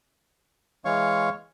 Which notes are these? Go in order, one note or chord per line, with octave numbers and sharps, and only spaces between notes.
E3 G#3 C#5 F5 C#6